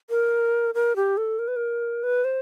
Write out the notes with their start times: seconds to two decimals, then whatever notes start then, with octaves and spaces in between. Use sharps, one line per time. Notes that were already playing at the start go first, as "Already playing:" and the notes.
0.10 A#4
0.75 A#4
0.96 G4
1.17 A4
1.39 A#4
1.48 B4
1.56 A#4
2.03 B4
2.24 C5